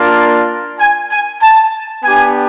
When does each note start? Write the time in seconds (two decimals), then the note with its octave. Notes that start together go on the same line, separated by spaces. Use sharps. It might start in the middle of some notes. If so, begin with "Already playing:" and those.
Already playing: A#3 D4 F4
0.80 G#5
1.11 G#5
1.42 A5
2.03 B3 D4 G4 G#5